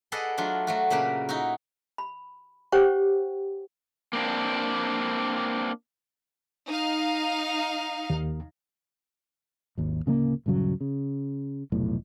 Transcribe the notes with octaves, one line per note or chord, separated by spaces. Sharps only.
G#4 A4 B4 D5 D#5 F#5
F#3 A3 D4 F4
F#3 A3 F#4
A#2 C#3 A#3 B4 B5
D#4 E4 F#4
B5
G4 C5 C#5 F#5 G5 C#6
A#3 C4 D4
D#4 F5
D#2
G#1 D#2
D1 C#3 A3 A#3
D#1 G2 C#3 F#3
C#3
F1 B1 A2